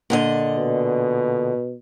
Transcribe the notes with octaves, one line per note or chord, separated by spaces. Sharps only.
A#2 D3 D#5
B2